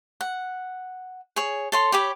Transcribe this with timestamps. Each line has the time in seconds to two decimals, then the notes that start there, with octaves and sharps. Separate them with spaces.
0.21 F#5
1.36 G#4 C#5
1.72 A4 C#5 C6
1.92 G4 C#5 B5 D6